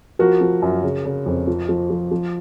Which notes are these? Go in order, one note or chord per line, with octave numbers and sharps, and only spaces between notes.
F3 F#4 A#4
F3
F#2
C#3
C#3
F2
F3
F3
F3
F3